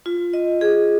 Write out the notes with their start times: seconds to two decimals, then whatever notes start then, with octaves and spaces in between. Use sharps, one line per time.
0.06 F4
0.33 D#5
0.61 G#4